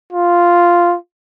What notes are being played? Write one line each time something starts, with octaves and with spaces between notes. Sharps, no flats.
F4